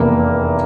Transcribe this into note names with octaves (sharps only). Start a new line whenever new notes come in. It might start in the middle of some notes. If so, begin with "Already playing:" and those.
Already playing: F1 E2 E3 A#3 E4